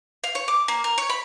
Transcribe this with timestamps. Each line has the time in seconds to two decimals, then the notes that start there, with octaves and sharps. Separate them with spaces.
0.24 F5
0.35 C#5
0.48 D6
0.68 A#3
0.84 A#4
0.98 C#5
1.10 B5